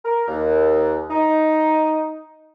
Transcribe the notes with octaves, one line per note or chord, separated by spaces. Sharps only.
A#4
D#2
D#4